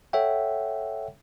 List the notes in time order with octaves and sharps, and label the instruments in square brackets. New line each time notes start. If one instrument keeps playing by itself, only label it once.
[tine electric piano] A4 C#5 E5 F#5 G5